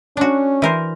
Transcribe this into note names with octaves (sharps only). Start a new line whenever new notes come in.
C#4 D4 F#4
E3 A#4 C5